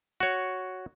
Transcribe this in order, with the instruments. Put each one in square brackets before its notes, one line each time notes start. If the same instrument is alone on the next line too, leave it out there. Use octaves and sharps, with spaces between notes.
[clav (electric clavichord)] F#4 C#5